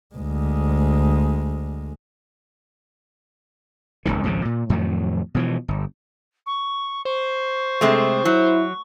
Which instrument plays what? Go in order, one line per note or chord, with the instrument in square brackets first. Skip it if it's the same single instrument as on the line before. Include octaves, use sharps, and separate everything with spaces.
[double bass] D2 G#3
[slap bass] D1 G1 C#2 D#3
G#1 C#2 C#3 F3
A#2
F2 A2 D#3 F#3
B2 E3 F3
G1
[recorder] C#6
[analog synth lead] C5 [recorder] C#6
[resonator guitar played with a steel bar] C3 G#3 A3
[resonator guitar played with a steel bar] F#3 [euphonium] E4